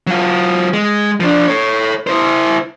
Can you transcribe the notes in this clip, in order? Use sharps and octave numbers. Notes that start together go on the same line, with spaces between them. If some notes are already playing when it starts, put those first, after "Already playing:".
F#3 F4
G#3
F3 D4
A4 C#5
E4 C5